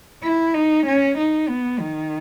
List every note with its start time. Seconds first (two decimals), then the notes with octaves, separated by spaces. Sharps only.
0.23 E4
0.54 D#4
0.86 C#4
1.17 D#4
1.49 B3
1.79 D#3